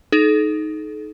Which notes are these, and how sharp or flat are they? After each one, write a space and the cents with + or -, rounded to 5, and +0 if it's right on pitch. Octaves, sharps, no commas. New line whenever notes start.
D#4 +0 A4 -45